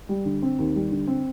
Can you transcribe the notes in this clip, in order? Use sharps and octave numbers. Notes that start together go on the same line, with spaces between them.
G3
D3
C4
D#2
G3
D3
C4